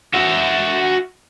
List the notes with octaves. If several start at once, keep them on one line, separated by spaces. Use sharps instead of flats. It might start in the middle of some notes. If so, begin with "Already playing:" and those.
F#4 E5